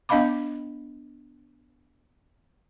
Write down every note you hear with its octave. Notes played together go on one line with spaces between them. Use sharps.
B3 D4 D#5 F5 B5 D6